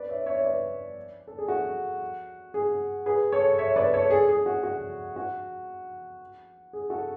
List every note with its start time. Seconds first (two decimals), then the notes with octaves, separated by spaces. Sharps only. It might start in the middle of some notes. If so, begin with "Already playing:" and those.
Already playing: B4 D5
0.09 C#5 E5
0.26 C#5 E5
0.44 B4 D5
1.27 A4
1.39 G#4
1.48 F#4
2.54 G#4
3.06 G#4 B4
3.32 A4 C#5
3.58 C#5 E5
3.76 B4 D5
3.94 A4 C#5
4.10 G#4
4.29 G#4
4.46 F#4
4.63 F#4
5.16 F#4
6.73 G#4
6.90 F#4 A4